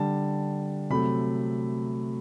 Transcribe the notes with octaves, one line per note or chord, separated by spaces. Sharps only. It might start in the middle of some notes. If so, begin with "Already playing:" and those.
Already playing: D3 G3 A5
C3 F#3 A3 B5